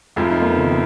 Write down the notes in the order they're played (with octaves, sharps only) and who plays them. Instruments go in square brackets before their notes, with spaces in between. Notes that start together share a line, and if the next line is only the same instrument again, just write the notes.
[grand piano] F1 F2 F3 [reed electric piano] G#3
[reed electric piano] D#4
A#3
B3
C#3
D#3